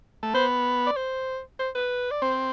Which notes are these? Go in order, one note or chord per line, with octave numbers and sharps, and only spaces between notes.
A3
B3 C5
D5
C5
C5
B4
D5
C4 C5